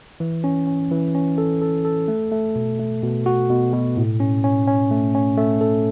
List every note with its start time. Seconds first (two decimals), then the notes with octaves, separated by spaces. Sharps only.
0.20 E3
0.44 C#4
0.67 C#4
0.91 E3
1.15 C#4
1.38 A4
1.62 A4
1.85 A4
2.08 A3
2.32 A3
2.56 B2
2.79 A3
3.03 B2
3.26 F#4
3.50 B2
3.73 B2
3.97 A2
4.20 C#4
4.44 C#4
4.67 C#4
4.91 A3
5.15 C#4
5.37 A3
5.61 A4